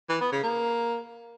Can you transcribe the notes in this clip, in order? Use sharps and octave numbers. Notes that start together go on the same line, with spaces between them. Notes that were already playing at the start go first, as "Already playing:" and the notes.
E3
B3
C#3
A#3